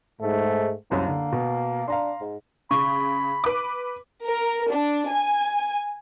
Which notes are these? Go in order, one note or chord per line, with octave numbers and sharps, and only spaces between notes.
G#2 A3
C2 F#2 A#3 C#4
D3
B2
D4 F5 A#5 C6
G#2
C#3 B5 C#6
B4 D6
A#4
D4
G#5